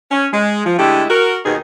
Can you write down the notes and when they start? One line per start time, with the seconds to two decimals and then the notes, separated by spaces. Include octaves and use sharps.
0.11 C#4
0.33 G#3
0.66 F3
0.79 D3 G#3 A3 E4 G4
1.10 F#4 A#4
1.46 D#2 B2 D#3 D#4 G#4